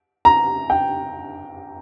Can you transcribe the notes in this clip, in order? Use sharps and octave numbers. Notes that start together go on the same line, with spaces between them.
A#5
G5